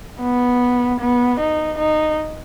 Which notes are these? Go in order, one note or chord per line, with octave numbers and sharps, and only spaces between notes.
B3
B3
D#4
D#4